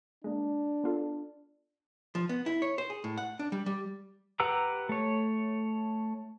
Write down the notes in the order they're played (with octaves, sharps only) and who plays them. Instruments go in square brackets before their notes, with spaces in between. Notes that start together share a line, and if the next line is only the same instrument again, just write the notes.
[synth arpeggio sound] G#3 A#3 [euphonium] D4
[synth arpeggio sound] B3 F4 A4
[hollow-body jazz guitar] F3
B3
E4
C#5
C5
G#4
A2
F#5
D4
G3
G3
[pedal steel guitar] G4 B4 F#5 A#5 E6
A3 C#5